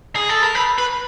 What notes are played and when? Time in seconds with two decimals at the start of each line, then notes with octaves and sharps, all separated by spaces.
0.16 G#4
0.29 A4
0.42 A#4
0.55 B4
0.78 B4